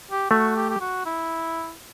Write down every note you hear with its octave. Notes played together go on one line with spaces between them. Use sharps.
G4
A3 F#4
G4
G4
F#4
E4